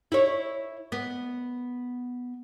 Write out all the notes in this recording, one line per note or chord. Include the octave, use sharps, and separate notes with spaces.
E4 C#5
B3